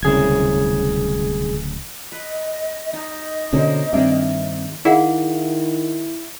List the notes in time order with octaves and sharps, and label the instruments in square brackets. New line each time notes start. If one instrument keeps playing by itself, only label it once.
[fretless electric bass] D1 C#3 [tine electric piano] C2 G#4 G#6
[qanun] B4 [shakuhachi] D#5
[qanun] D#4 [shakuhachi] D#5
[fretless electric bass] B2 D3 C#4 [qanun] A#3 C5
[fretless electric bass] G2 [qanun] D#3 A#3 [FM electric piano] C4 D4 E5
[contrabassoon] D#3 [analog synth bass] E4 [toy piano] G#4 F5 F#5